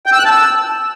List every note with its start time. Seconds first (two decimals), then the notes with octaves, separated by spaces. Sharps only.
0.06 G5
0.13 E6
0.19 F#6
0.25 A5
0.31 E6